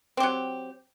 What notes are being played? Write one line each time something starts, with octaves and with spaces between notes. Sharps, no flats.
F#3 C4 G4